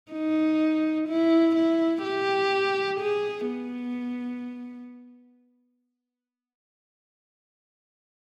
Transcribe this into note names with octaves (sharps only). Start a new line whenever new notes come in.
D#4
E4
E4
G4
G#4
B3